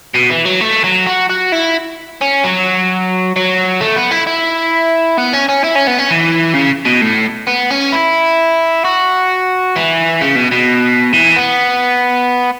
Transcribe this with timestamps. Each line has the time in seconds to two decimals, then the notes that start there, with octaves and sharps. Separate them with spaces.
0.15 B2
0.30 E3
0.46 F#3
0.61 A3
0.84 F#3
1.06 F#4
1.29 F#4
1.52 E4
2.22 C#4
2.44 F#3
3.36 F#3
3.81 A3
3.96 B3
4.12 E4
4.27 E4
5.18 B3
5.33 C#4
5.49 C#4
5.64 E4
5.75 C#4
5.87 B3
5.99 C#4
6.10 E3
6.55 C#3
6.86 B2
7.02 A2
7.47 B3
7.70 C#4
7.92 E4
8.84 F#4
9.76 E3
10.21 C#3
10.36 B2
10.52 B2
11.13 E3
11.36 B3